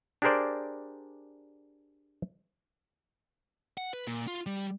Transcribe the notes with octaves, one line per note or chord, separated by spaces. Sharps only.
D4 G4 G#4 A#4 C5 D5
F#5
B4
A#2
F4
G3